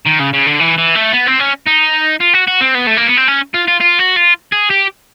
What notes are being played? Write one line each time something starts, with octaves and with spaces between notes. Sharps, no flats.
D#3
C#3
C#3
D3
E3
E3
A3
B3
C4
C#4
D#4
F4
F#4
F#4
C4
B3
A3
A#3
B3
C4
C#4
F4
F4
F4
F#4
F4
G#4
G4